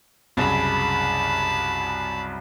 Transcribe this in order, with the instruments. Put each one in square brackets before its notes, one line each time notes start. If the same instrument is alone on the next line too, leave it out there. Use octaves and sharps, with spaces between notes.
[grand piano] C2 F#2 C#3 [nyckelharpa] A5 B5